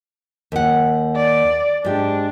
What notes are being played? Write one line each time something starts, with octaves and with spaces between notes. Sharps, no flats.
D#2 F#5
D5
G#2 D4 G4